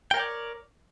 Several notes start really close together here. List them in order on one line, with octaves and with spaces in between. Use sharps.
G5 A#4 C#5 D5